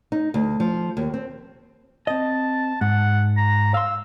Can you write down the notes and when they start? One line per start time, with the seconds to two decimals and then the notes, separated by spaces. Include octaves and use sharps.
0.12 D#4
0.34 D2
0.60 F3
0.97 D#2
1.14 C4
2.07 C4 D#5 A5
2.81 G#2 F#5
3.37 A#5
3.74 F5 C6 E6